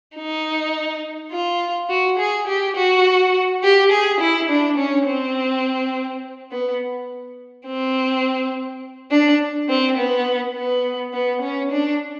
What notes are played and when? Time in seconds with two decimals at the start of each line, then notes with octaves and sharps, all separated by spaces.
0.16 D#4
1.32 F4
1.89 F#4
2.19 G#4
2.48 G4
2.76 F#4
3.63 G4
3.91 G#4
4.20 E4
4.49 D4
4.78 C#4
5.07 C4
6.51 B3
7.67 C4
9.11 D4
9.69 C4
9.97 B3
10.56 B3
11.13 B3
11.42 C#4
11.71 D4